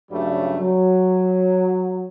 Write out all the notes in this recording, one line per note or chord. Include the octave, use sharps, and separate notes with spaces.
G2 C#3 F#3 G3 A3
F#3